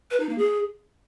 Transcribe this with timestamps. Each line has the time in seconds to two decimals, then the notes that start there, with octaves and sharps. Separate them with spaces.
0.11 B4
0.20 D#4
0.29 A#3
0.38 G#4